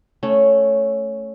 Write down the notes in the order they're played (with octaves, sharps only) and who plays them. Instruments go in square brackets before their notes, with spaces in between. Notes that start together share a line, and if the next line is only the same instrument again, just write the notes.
[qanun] A3 C#4